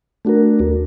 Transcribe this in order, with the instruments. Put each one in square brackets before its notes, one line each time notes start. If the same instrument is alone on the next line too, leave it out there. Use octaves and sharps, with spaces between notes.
[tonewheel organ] A3 D4 F#4 A#4
D#2